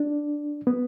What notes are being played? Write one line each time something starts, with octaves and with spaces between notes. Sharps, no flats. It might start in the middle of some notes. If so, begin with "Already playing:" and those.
Already playing: D4
B3